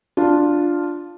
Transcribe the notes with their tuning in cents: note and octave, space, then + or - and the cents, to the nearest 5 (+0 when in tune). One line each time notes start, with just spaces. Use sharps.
D4 +0 F4 +0